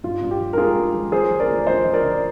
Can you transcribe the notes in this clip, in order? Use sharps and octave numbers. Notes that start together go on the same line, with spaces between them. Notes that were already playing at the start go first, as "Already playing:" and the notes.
G2 F4
G2
G4
F3
A#4
G#3 F4 G#4
G#3
F3
F3 G#4 C5
F3
A#4 D5
D2
F3 C5 D#5
F3
A#4 D5
D3